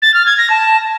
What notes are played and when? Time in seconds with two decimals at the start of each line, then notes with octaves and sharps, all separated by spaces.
0.02 A6
0.14 F6
0.26 G#6
0.38 A#6
0.50 A5